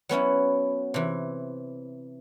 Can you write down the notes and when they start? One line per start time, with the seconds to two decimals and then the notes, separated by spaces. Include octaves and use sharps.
0.09 F#3 B3 C#4 E4
0.94 C3 E3